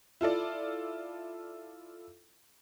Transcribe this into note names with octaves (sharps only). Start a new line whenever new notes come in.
E4 F4 A4 D5